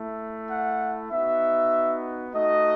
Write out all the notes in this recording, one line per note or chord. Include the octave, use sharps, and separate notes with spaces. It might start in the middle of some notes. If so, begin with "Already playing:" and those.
Already playing: A3 E4
F#5
B3 D#4 F#4 E5
A3 D#4 F#4 D#5